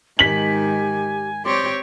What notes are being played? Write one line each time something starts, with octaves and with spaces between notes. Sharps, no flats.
G#2 D#3 G4 G#5 B6 F#7
C4 G4 C#5 D5 C6